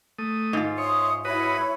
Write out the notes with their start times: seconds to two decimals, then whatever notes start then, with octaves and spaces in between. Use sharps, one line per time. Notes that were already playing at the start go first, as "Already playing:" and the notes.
0.19 A3 D#6
0.53 G#2 F4
0.78 C#5 E5 C6 D#6
1.25 E4 F#4 B4 C#5 B5 D#6